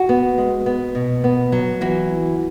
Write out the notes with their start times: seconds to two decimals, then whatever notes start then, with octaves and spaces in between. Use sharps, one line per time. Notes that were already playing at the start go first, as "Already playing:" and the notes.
Already playing: F#4
0.09 B3
0.38 G#3
0.66 B3
0.95 B2
1.24 B3
1.52 F#3
1.81 E3 F#4